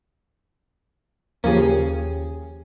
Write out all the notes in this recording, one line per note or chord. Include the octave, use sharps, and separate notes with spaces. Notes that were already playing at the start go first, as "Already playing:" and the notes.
D#2 C#3 F3 A#3 C#4 G4 G#4